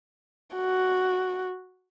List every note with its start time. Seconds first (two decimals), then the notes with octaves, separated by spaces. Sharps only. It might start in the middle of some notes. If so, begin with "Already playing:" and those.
0.55 F#4